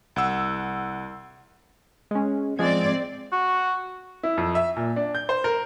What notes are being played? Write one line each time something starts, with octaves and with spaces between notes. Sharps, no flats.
C2 F#5 E6
G#3 C#4
F3 G#3 C4 D5 G#6
F#4
E4
F2
E5
A#2
D4
G6
C5
A#4